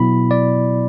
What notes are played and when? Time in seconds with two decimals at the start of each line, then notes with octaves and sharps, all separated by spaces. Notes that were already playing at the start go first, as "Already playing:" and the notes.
Already playing: B2 F#3 B3 E4 B5
0.31 D5